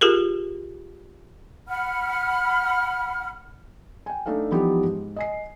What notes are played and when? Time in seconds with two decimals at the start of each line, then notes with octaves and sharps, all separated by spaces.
0.01 F4 G4 G#4 A#4
1.68 F#5 B5 F6
4.06 G5 G#5
4.26 A3 D4 D#4 A4 F5
4.51 E3 F3 G3 B3 D#4 G4
4.83 G#2
5.16 D#5 G#5 C7